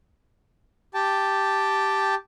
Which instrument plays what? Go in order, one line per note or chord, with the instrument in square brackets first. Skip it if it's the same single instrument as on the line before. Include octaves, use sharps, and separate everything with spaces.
[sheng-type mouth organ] G4 G5 A5